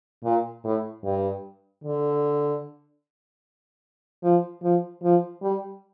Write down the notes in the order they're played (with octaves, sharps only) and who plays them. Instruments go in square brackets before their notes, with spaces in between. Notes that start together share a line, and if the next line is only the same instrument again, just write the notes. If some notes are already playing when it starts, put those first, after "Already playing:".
[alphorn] A#2
A2
G2
D3
F3
F3
F3
G3